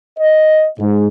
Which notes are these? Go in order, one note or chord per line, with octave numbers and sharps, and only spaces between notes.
D#5
G#2